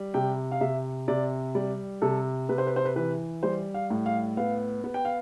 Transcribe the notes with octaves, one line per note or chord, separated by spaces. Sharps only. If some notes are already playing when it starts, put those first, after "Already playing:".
Already playing: G3
C3 G5
F5
C3 E5
C3 D5
G3 D5
C3 A4
C3 B4
C5
B4
C5
B4
E3 B4
G3 C5
F5
A2
F5
B3 F5
B3
G5
F5